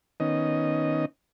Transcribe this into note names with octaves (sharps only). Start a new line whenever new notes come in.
D#3 B3 C#4 D#4 D#5